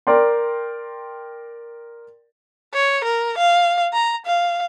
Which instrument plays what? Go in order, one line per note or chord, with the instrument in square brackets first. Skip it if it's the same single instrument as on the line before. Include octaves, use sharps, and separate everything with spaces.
[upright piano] A#4 D5 G5 C6
[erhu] C#5
A#4
F5
A#5
F5